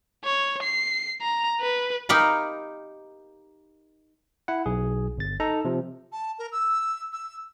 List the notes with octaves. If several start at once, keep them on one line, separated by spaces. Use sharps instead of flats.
C#5
C7
A#5
B4
D#4 G4 A#4 F5 B5
E4 F#5
B1 G#4
G1 A6
D#4 A4 A#5
C3 F3
A5
A#4
E6
E6